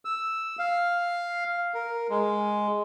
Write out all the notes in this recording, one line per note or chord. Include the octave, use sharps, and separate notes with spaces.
E6
F5
A#4
G#3